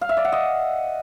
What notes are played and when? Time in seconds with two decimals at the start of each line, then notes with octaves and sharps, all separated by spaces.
0.01 F5
0.09 E5
0.17 D5
0.25 F#5
0.32 D#5